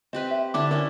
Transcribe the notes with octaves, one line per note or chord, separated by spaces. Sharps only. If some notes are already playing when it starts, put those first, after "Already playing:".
C4 G4 B4 D#5
E5
D3 D4 E4 D6
C#4 E4 A#4